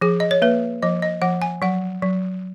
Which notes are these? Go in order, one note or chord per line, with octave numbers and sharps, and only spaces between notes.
F3 G#4
D#5
C#5
A#3 B4
F3 D#5
D#5
F3 F#5
G#5
F#3 F#5
F#3